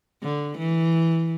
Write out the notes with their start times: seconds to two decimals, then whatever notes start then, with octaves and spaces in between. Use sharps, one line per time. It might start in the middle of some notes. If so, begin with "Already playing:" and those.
0.23 D3
0.58 E3